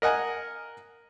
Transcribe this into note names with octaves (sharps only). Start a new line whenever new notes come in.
A#4 D#5 F#5 G#5